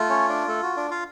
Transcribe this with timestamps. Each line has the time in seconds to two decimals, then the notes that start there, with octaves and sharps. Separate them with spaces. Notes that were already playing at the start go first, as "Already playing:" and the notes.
Already playing: A3 F4
0.09 C#4 C#5
0.28 D4 D5
0.48 A3 A4
0.63 F#4
0.77 D4 D5
0.91 F4 F5